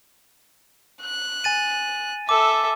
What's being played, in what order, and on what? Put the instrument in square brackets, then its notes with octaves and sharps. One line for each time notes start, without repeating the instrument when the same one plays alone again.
[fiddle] F#6
[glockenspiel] G#5 A6 D#7
[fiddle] A4 E5 [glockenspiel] D6